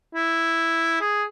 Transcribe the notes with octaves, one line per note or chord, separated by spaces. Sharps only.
E4
G#4